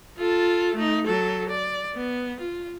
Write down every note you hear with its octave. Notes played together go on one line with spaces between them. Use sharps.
F4 A4
A3 D#4
F#3 A4
D5
B3
F4